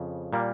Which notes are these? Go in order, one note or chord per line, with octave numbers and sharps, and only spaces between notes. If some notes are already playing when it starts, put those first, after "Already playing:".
Already playing: F2 C#3
A#2 G3 A#3